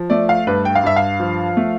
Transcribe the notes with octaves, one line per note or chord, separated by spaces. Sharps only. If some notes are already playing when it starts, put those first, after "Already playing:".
Already playing: F3
A3 D5
F5
G2 B4
G5
F5
G2 E5
F5
F3
A3